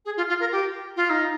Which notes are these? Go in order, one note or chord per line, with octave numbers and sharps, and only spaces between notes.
G#4
F4
F4
A#4
G4
F4
D#4